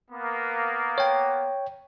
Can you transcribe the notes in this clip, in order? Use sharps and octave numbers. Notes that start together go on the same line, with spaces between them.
A#3 B3
C#5 G5